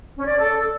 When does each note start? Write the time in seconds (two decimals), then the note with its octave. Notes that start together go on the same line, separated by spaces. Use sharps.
0.17 C#4
0.28 D5
0.38 A4